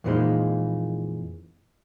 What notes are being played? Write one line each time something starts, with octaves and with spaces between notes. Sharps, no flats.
F2 A#2 E3 F3 G#3 D#4